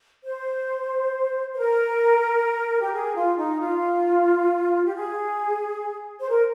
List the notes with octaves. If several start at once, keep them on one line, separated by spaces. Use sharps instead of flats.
C5
C5
A#4
G4
G#4
F4
D#4
F4
G4
G#4
C5
A#4